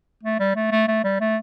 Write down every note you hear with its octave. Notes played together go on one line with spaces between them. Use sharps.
A3
G3
A3
A3
A3
G3
A3